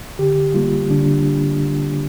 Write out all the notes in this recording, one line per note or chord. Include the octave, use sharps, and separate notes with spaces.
D3 G4
G3 A#3 F4
D3 D4